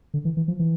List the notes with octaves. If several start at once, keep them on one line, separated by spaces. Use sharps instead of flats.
D3
E3
E3
F3
E3